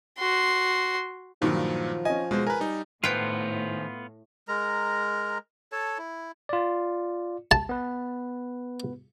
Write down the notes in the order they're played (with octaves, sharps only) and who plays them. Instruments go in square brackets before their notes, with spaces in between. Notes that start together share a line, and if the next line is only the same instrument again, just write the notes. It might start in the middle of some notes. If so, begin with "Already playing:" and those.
[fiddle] F#4 C6
[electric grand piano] G2 A#2 [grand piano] D#3 F#3 [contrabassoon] F3
[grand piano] C#4 D#5 [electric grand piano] G#5
[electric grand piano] B2 C5 [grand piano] G#3
[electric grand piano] A#4 B4 [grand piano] G#5 A#5
[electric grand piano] G3 D#4
[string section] A2 [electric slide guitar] D#3 C5 [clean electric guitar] B3 F4 [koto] B4 G5
[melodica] G#3 A#4 A#5
A4 C#5 A5
E4
[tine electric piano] F4 D5
[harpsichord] A5
[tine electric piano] B3 B4